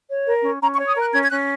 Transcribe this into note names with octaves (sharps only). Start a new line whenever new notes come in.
C#5
A#4
C#4
C#4 A#5
C#6
C#5
D#6
A#4 F#6
C#4 G#6
G#6
C#4 F#6